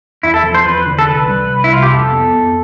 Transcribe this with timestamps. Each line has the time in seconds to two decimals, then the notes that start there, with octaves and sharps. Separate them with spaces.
0.23 E2 E4
0.34 A4
0.44 F3
0.55 C5
0.65 E2 B4
0.86 D3
0.99 A4
1.07 C2 B4
1.29 G3
1.49 C2
1.64 E4
1.71 C3 F4
1.83 G4
1.91 F2 A4
2.13 B3
2.33 F2